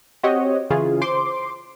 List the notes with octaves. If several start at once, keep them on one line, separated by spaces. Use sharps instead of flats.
C4 F#4 G4 C#5 D#5
C#3 E3 C#4 F4 G#4
C5 C6 D6